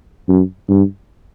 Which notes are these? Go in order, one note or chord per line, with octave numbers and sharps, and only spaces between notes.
F#2
G2